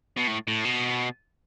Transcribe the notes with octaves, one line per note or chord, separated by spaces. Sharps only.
B2
A2
A2
B2